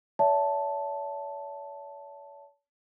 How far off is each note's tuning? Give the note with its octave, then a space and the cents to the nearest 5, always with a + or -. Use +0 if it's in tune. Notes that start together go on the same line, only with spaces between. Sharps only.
C#5 +40 E5 +0 A5 +0